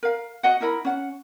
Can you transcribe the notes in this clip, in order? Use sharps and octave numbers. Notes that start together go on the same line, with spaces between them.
A#4 F5
F#4 D#5 F#5
D#4 E4 A#4 B5
C#4 F#5